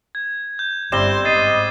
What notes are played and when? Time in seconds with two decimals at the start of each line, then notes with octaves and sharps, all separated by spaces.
0.15 G#6
0.59 G6
0.92 G1 G3 C4 E5 C6 E7 G7
1.25 G#2 D#5 A6 C7 D#7